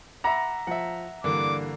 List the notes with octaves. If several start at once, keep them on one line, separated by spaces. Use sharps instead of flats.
E5 F#5 A#5 B5 D6
F3 E5 F#5
G2 D3 E3 A#3 D6